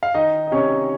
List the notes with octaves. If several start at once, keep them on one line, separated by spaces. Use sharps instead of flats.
F5
D#3 D#4 D#5
D#5
C3 C#4 C#5